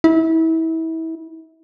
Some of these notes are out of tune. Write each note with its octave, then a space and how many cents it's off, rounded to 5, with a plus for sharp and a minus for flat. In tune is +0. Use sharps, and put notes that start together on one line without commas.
E4 -30